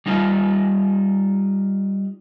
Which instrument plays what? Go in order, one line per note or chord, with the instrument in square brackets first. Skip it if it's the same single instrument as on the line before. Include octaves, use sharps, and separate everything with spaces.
[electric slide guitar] G3 D#4 F4